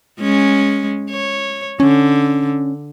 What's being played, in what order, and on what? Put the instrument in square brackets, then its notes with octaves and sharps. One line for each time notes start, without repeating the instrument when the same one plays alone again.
[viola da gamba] G#3 C#4
C#5
[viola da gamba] D3 [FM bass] C#4